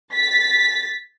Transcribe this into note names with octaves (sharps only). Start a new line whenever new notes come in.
A6 B6